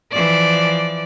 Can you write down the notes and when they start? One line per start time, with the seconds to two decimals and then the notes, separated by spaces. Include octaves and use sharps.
0.11 E3 F3 D5